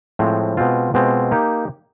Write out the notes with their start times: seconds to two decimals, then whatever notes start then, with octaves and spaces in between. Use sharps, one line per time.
0.19 A2 F3 G#3 C4
0.57 B2 G#3 C4 F4
0.94 B2 G#3 C4 F4
1.31 A#3 D#4 G4